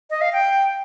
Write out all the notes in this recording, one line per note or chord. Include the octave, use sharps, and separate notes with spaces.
D#5
F5
G5